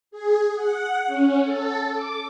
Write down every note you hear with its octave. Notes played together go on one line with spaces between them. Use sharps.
G#4
F#5
C#4
A4
D6